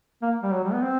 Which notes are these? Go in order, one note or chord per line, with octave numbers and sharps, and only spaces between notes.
A#3
G3
F#3
G3
B3
C4